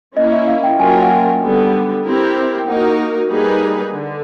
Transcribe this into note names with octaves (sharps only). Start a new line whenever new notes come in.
A#3 C#4 E4 D#5
E5
F5
G5
F#3 A#3 C#4 F4 A#4 G#5
G5
F#5
G5
D3 G3 B3
C4 E4 G4 A#4
G5
A#3 D#4 F#4 A#4 F#5
G3 A#3 D#4 G#4 B4
D3